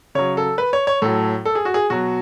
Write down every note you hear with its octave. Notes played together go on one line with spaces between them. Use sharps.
C#3 F#3 C#5
A4
B4
C#5
C#5
A2 F#3 A4
A4
G#4
F#4
G#4
B2 F#3 F#4